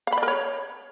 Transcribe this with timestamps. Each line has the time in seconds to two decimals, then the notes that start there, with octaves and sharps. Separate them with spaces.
0.07 F5
0.12 B5
0.18 D5
0.23 A#4
0.28 C#5